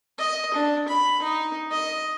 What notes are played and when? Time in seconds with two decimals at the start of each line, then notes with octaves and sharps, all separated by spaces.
0.19 D#5
0.54 D4
0.88 B5
1.22 D#4
1.71 D#5